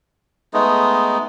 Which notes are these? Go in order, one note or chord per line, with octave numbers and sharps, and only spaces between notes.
G#3 A3 B3 D#4